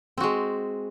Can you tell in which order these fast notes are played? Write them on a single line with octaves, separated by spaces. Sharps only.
C4 F#4 G#3